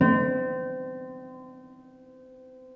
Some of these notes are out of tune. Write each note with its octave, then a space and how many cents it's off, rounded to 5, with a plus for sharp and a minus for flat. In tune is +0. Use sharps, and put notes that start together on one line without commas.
C4 -30